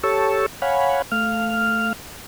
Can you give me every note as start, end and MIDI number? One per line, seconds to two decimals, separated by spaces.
0.04 0.46 67
0.04 0.46 69
0.04 0.46 73
0.04 0.46 81
0.04 0.46 85
0.04 0.46 88
0.62 1.02 73
0.62 1.02 77
0.62 1.02 78
0.62 1.02 80
0.62 1.02 83
1.12 1.93 57
1.12 1.93 77
1.12 1.93 89